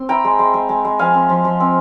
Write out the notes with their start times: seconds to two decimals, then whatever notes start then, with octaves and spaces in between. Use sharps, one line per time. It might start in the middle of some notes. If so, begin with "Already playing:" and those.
Already playing: C4 C6
0.09 E4 G5 A#5
0.24 G#3
0.39 G#3
0.54 G#3
0.69 G#3
0.84 G#3
0.99 F3 F5 G#5
1.14 C4
1.29 F3
1.44 F3
1.60 C4